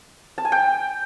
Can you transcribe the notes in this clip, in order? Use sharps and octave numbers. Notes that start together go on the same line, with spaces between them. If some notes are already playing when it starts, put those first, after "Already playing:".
A5
G#5
G5